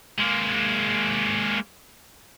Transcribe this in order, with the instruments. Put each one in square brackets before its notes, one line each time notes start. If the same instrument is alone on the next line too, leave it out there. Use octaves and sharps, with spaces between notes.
[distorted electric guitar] G#3 A#3